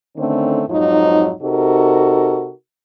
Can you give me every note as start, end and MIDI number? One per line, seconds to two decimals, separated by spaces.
0.17 0.63 50
0.17 0.63 51
0.17 0.63 57
0.17 0.63 60
0.17 0.63 61
0.69 1.31 41
0.69 1.31 44
0.69 1.31 53
0.69 1.31 54
0.69 1.31 63
1.42 2.52 48
1.42 2.52 63
1.42 2.52 66
1.42 2.52 69
1.42 2.52 70